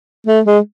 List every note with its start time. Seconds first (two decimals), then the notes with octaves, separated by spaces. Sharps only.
0.27 A3
0.45 G#3